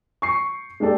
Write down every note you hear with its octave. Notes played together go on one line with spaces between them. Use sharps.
C#6 C7
G#3 A#3 D4 G4 A4 D5